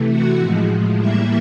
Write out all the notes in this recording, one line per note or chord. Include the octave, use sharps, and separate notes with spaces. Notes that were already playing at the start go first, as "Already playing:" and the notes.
Already playing: C3 E3 A3
F#4 F#5
A2 F3 G#3
A2 E3 G3 A#3 E4 E5